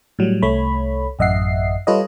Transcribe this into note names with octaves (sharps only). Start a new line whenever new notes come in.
A2 F#3 G3
C2 A3 C#5 B5
A1 F#2 D#5 E5 F#5 C7
G3 F4 A4 B4 C#5 D#5